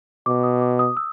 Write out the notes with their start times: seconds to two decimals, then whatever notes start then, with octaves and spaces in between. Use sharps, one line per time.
0.26 B2 D6
0.44 D#6
0.61 D6
0.79 D#6
0.97 E6